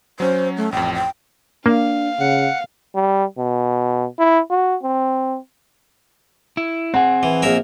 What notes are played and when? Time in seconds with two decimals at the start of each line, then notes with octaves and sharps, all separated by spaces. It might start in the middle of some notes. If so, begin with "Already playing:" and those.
0.20 F#3 C#4 C5
0.57 A3
0.72 A1 F2 G5
0.95 G5
1.66 A#3 D4 F5
2.19 C#3 F#5
2.95 G3
3.38 B2
4.19 E4
4.50 F#4
4.83 C4
6.57 E4
6.94 C4 G#4 F#5
7.23 E3
7.42 A#1 A#4 E5